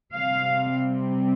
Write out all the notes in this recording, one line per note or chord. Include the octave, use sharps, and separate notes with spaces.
C3 G3 C4 F5